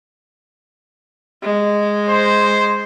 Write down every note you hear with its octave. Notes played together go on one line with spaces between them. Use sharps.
G#3
C5